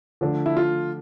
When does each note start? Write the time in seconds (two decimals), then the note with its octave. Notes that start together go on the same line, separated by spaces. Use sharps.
0.21 D3 F3 A3 D4
0.46 E4
0.57 F4